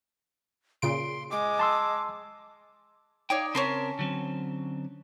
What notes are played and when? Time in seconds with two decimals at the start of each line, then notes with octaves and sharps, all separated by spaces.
0.82 A#2 C#3 C6 D7
1.31 G#3 D6
1.59 A5 C6 E6
3.30 D#4 C#5 D5 F5 G5
3.55 C#3 C4 C#4 A#4 A5 C6
3.99 D3 F#3 C4